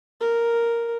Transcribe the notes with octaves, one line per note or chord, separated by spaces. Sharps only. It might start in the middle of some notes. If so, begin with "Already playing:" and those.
A#4